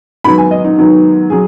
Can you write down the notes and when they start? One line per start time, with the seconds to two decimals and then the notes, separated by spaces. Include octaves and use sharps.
0.24 G#2 D#3 F#3 B3 B5
0.38 G#5
0.51 D#5
0.65 D#4
0.78 G#2 D#3 F#3 B3
1.30 F#3 G#4